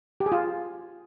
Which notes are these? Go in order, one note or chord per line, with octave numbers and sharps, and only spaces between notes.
G4
G#4
F4